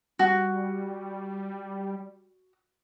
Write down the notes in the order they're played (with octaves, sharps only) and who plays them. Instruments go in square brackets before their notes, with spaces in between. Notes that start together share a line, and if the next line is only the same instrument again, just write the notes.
[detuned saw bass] G3 [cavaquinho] F#4